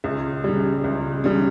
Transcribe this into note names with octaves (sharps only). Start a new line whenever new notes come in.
C#2
C#3 G3
C#2
C#3 G3